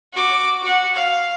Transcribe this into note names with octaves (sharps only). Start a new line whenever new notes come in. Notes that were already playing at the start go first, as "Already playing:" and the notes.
F#4 D6
F#4 F#5
F5